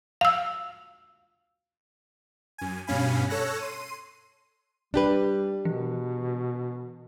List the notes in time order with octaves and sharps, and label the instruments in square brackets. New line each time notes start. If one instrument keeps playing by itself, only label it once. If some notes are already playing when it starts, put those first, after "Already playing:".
[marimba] F5 E6
[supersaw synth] F#2 G#5
G2 B2 C#4 F5 G#5 B5
A4 C#5 E6 F#6 A#6
C6 D#7
[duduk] G3 [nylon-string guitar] D4 G4 B4
[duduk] B2 [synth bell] E3